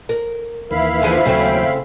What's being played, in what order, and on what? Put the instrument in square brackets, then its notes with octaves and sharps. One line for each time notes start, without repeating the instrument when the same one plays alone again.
[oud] A#4
[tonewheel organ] D#2 D#3 E3 [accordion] E4 F5 B5
[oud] D3 F3 G#4
[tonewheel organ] D#2 F#3 G5 [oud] C#3 A3 C4